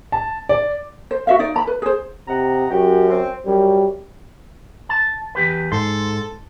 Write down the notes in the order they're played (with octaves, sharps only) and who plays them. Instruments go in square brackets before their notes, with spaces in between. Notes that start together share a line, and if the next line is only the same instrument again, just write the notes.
[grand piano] A5
D5
[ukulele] C5
F#4 E5 F5
D#4 D5
E4 A#5 B5
B4
G#4 C5
[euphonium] C3 [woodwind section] D#5 F#5 A#5
[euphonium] F#2 [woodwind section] F#4 G4
[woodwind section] C4
[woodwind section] F#2 [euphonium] G3
[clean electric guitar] A5
E2 G4 B4
[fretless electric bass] G#2 [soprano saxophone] A4 [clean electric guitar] C6